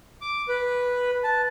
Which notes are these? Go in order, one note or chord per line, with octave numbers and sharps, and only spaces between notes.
D6
B4
A5